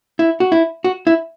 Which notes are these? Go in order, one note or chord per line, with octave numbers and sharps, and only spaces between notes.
E4
F#4
E4
F#4
E4